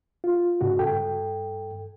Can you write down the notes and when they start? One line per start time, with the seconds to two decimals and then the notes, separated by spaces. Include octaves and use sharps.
0.24 F4
0.61 G#2 C#3 F#4
0.79 G2 A4 G5